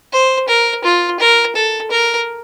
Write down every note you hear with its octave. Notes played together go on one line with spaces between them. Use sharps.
C5
A#4
F4
A#4
A4
A#4